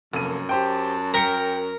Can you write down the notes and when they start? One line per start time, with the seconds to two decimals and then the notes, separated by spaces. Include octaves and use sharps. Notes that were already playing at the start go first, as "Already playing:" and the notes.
0.13 F1 F#2 A#3 A4 D#7
0.49 G4 C5 G5 A5
1.14 A#4 G5 B6 C#7